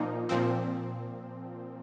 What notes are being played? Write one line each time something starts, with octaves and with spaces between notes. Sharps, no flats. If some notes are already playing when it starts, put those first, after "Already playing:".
Already playing: A#2 F3 A#3 D#4
A#2 F3 C4